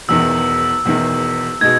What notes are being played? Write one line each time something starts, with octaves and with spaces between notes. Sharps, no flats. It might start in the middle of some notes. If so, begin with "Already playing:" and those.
E1 E2 D#3 E6
E1 E2 D#3
B2 G#3 D#4 G#6